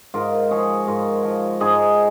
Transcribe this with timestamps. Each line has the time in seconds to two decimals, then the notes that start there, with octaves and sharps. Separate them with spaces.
0.14 G#2 F4 A#4
0.51 F3 G#4 C#5
0.87 G#2 F4 A#4
1.23 F3
1.60 G#2 D#4 G#4